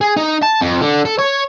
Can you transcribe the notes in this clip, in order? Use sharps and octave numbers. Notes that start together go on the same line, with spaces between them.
G#4
D#4
A5
F2
D3
A4
C#5